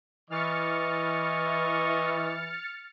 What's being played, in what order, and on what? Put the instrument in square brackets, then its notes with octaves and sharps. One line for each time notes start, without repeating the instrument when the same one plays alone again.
[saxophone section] E3 [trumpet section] D#5 C#6 [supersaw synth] F6 A6 C#7